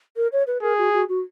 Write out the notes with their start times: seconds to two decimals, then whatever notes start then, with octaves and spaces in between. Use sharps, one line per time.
0.17 A#4
0.32 C#5
0.47 B4
0.62 G#4 A#4
0.78 F#4
0.93 F#4
1.09 F#4